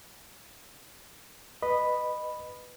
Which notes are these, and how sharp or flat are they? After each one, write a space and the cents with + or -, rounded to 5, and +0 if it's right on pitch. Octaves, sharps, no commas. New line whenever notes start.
B4 +0 D#5 -20 B5 +0